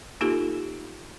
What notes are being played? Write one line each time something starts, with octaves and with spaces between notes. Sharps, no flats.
A#3 D#4 F4 G4 A4